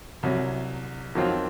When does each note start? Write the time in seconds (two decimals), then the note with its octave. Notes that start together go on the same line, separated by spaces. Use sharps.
0.23 C2 C3 F#3
1.15 F2 D#3 F#3 C4 F4